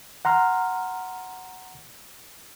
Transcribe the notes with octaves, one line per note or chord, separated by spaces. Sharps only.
F#5 A#5 C6 F6